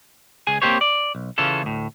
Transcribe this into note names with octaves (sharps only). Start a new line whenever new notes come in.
C#2 G#4 G#5
A#3 C4 G4 C5 C#5
D5
B1
C#3 E3 C#4 F4 A4
D2 A2